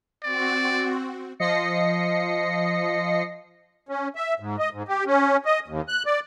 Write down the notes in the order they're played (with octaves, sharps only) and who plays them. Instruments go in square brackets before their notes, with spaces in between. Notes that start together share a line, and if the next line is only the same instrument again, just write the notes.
[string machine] C4 F#4 [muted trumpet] D5
[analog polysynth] F3 D#5 A#6 C7 C#7
[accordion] C#4
E5
G#2
D#5
G#2
G4
C#4
D#5
D#2
F#6
D5